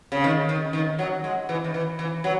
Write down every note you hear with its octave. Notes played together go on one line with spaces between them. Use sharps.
C#3
D#3
D#3
D#3
F#3
G#3
E3
D#3
E3
E3
F#3